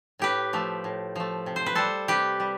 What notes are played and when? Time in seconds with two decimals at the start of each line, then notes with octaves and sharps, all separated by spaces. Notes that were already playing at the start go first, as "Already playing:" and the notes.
0.19 A2 G4 B4
0.53 F3 A3
0.84 A2
1.16 F3 A3
1.46 C3
1.56 C5
1.66 B4
1.75 G3 A4 C5
2.08 C3 G4 B4
2.40 G3